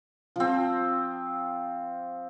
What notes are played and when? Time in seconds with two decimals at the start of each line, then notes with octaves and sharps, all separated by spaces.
0.36 F3 C4